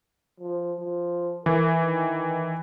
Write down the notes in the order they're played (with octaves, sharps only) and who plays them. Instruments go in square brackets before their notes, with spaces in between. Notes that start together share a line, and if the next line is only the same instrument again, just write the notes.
[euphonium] F3
F3
[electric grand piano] E3 [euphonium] A#4
[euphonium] D#3